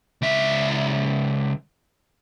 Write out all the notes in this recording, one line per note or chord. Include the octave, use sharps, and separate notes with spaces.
C#2 E5